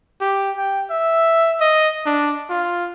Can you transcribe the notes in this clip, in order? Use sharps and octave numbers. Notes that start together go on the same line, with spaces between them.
G4
G5
E5
D#5
D4
F4